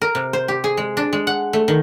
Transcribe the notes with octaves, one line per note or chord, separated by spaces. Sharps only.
A#4
C3
C5
G4
G#4
G#3
D4
G#3
F#5
A3
D#3